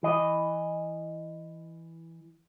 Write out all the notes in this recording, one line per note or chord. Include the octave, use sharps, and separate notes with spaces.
E3 D#5